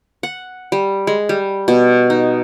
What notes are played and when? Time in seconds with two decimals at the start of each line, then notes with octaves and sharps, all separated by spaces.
0.23 F#5
0.72 G3
1.07 G#3
1.29 G3
1.68 B2
2.10 D#4